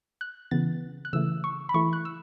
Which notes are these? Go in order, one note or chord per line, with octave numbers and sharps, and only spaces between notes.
F#6
C#3 E3 B3 A6
F#6
C#3 E3 A3 E6
C#6
B5
E3 A3 E4 C#6
F#6
E6